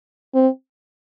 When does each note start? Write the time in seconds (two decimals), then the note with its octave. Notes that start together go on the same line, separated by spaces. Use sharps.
0.35 C4